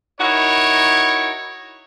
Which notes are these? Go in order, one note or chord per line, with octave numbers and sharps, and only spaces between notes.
D#4 E4 F#4 A#4 C#5